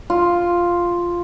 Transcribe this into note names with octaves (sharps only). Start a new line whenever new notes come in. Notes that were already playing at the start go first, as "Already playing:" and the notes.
F4